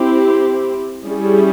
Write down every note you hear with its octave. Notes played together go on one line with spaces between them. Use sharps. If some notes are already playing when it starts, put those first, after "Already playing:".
Already playing: C4 E4 G4
G3 C#4 E4 G#4